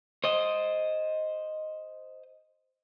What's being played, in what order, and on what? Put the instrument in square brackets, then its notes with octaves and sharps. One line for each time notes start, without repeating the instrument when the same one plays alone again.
[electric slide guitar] C5 D#5